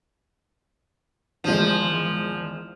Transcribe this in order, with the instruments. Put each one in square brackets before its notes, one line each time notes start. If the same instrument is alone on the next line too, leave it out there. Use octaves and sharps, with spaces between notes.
[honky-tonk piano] G#1 E2 G#3 [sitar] F3